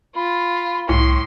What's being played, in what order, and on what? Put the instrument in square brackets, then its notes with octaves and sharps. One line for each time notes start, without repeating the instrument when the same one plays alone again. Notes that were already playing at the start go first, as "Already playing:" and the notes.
[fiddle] F4 [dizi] B5
[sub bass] C2 [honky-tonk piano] A2 [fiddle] C6